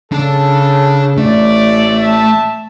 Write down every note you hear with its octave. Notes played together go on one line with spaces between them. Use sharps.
C#3 D4 A4 A5
A1 A3 D5
E5 A5